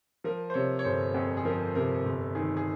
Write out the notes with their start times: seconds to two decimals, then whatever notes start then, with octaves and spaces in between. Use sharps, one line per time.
0.24 F3 A#4
0.50 C5
0.54 C3 C#5
0.79 C#5
0.84 G1 C5
1.14 F2 G#4
1.37 G#4
1.45 F3 A#4
1.75 C3 A#4
2.06 G1
2.35 D#3 G#4
2.57 G#4